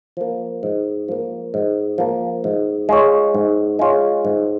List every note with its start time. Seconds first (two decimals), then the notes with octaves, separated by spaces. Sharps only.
0.17 F3 A#3
0.63 G#2
1.08 F3 A#3
1.54 G#2
1.98 F3 A#3
2.44 G#2
2.89 G#3 F4 C#5
3.34 G#2
3.79 G#3 F4 C#5
4.25 G#2